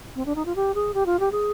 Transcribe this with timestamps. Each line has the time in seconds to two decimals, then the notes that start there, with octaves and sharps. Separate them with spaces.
0.16 C4
0.26 D4
0.35 D#4
0.46 F4
0.56 G4
0.75 G#4
0.94 G4
1.06 F4
1.20 G4
1.32 G#4